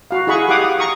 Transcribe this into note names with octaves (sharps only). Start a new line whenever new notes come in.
F#4 F5
E4 G#4 F#5 B5 C#6
G4 F5 F#5 D6 D#6
A#5 C#6 D#6